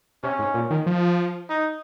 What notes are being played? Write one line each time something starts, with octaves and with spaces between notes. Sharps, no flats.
C3 C#4
G#2
A#2
D#3
F3
D#4